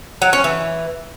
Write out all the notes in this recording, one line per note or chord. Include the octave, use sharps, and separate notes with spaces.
F#3
C#4
E3